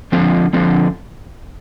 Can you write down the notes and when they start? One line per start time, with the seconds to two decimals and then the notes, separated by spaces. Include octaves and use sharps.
0.12 D3 F3 C4
0.53 D3 F3 C4